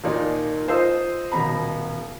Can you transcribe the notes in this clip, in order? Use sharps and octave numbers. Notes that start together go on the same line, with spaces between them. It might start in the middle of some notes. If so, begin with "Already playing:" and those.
D#2 A#2 D#3 D#4 D5
F4 C5 D#5 D#6 E6
D#1 B2 A#5 B5